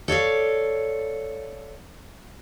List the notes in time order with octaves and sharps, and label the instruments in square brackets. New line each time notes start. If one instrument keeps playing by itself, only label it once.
[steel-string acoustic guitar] A4 C#5 D5 F5